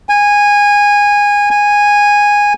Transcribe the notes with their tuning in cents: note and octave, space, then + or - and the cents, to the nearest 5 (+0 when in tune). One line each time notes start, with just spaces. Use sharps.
G#5 -15
G#5 -10